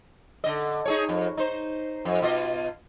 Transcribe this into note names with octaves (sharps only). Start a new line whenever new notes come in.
D3 D#5
D#4 G#4 C#5
F2
D#4 C5
F2
B2 F4 D#5